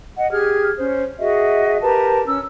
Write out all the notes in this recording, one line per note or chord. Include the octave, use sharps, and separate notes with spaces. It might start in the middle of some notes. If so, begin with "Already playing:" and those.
D#5 F#5
G4 G#4 F6 G#6
C#4 C5
F#4 G#4 D#5 E5
G4 A#4 B4 A5
C#4 E6